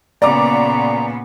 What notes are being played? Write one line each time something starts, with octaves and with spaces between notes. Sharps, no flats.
A#2 C#3 B3 D5 A#5 D6